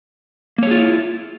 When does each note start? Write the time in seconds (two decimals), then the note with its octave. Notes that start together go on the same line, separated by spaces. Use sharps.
0.58 A#3
0.63 C#5
0.67 G#4
0.71 F4
0.76 E4